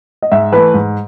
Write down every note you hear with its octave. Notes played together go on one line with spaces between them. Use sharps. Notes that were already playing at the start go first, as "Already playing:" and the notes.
D#5
G#2 E5
E3 A3 B4
G#2